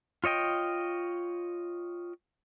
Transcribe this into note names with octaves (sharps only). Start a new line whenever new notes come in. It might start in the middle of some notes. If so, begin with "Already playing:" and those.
F4 C#5 D#5 G5